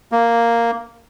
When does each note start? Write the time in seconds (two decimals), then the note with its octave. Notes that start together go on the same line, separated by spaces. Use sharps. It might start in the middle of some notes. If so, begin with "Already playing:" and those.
0.12 A#3